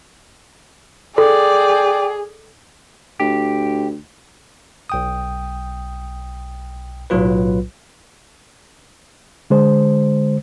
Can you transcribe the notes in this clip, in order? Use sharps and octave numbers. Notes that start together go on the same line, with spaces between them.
G#4 A4 D5 G5
D2 G4
B1 G5 D#6
B1 A2 F#3 F4 B4
D3 G#3 C5